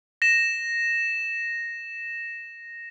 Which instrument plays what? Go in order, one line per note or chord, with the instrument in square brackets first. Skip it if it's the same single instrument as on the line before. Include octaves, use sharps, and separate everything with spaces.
[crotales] A#6 E7